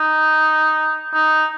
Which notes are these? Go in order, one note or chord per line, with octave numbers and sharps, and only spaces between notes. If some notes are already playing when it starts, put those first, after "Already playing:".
Already playing: D#4
D#4